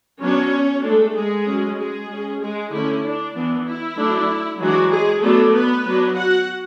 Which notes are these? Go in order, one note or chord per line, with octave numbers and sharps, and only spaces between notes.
F#3 B3 C#4 D4 C#5
G#3 A3 D4 A4
G#3 G#4
F#3 C#4
G#3 G#4
G#3 C#4
G#3 G#4
D3 A3 C#4 E4
D4
E3 B3 D4
E4
F#3 A3 D4
E3 F#3 G#3 D4 F#4
G#3 G#4
F#3 A3 B3 D4 A4
B3 B4
F#3 B3 D4
F#4 F#5